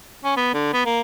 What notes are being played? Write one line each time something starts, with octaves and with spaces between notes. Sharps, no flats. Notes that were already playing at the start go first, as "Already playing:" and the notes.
C#4
B3
D3
B3
A#3